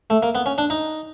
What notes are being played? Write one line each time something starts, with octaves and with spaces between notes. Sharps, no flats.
A3
A#3
B3
C#4
D4
D#4